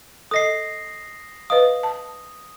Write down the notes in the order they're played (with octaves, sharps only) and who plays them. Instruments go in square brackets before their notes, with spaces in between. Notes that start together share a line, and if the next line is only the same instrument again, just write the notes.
[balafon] A4 D#5 [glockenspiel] D#6 A#6 C7
[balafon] B4 D#5 F5 [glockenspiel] D#6
[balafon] A5